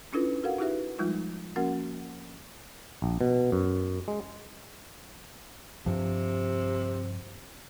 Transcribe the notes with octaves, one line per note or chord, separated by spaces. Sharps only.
C#4 D4 E4 F4 A4 B4
F#4 A4 A#4 F5 F#5
D#4 E4 F#4 G4 B4 E5
F3 G3 G#3 D#4 F4
F3 A#3 C#4 F#4 A#4 F#5
A#1
B2
F#2
G#3
G2 C3 F3